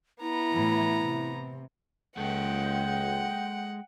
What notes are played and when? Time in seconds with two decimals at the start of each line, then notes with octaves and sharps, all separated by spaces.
0.21 B3 E4 A#5
0.52 A2 E3
1.02 C3
2.17 C#2 G#3 A4 F#5 G5